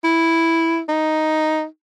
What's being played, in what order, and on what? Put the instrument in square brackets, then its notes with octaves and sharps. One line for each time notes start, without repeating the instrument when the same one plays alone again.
[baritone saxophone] E4
D#4